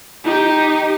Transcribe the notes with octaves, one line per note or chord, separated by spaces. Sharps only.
D#4 G4